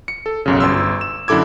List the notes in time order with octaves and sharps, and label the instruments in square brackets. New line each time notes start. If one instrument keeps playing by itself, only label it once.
[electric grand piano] C#7
A4
B1 F#2 C#3
G1 C6 E6
E7
F#2 D3 E4 A4 D6 G#6